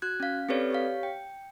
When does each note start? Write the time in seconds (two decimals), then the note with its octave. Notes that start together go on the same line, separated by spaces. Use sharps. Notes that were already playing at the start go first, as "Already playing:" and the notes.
0.02 F#4 F#6 G#6
0.20 C#4 F5
0.49 C4 G4 A4 B4 C#5 D5
0.71 G4 C#5 F5
1.03 G5